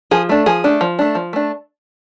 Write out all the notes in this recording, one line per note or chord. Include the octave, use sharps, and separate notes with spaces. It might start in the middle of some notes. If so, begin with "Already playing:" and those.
F3 G#4
A3 D4
F3 G#4
A3 D4
F3
A3 D4
F3
A3 D4